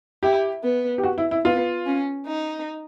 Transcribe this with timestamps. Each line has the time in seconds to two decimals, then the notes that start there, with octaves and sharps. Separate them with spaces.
0.23 E4 G4
0.63 B3
0.98 G4
1.03 F#4
1.18 E4
1.31 E4
1.45 B3 F4
1.86 C#4
2.27 D#4